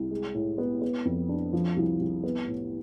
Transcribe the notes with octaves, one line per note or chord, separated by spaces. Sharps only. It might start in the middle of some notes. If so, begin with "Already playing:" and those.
Already playing: C2
G#3
A2
B3
B3
F2
D4
F3
C2
C2
B3
A2